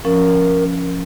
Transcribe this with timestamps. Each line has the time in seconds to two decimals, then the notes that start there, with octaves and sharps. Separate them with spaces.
0.05 F3 C#4 A#4